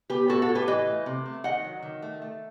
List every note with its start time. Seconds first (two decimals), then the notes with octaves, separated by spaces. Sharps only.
0.10 B3 G4 B4
0.28 A2 F#4 A4
0.42 F#4 A4
0.49 A2
0.55 G4 B4
0.67 E3 B4 D#5
0.87 A3
1.06 C3
1.26 A3
1.44 D#3 D#5 F#5
1.64 F#3
1.83 D#3
2.02 A3
2.22 A3